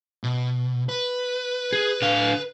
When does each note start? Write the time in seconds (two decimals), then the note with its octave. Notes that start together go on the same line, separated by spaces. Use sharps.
0.24 B2
0.89 B4
1.73 G#4
2.02 D3 F5